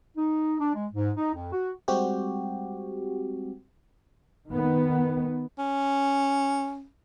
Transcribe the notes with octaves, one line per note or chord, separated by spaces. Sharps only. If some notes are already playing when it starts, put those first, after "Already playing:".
D#4
D4
G#3
G#2
D#4
F2
F#4
G3 G#3 C4 F#4 G4
D#3 B3
C#4